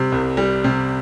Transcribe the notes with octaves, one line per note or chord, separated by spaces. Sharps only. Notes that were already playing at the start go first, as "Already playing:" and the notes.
Already playing: C3 G3
C2
G3
C3